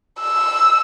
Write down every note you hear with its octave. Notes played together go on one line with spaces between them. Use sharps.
E6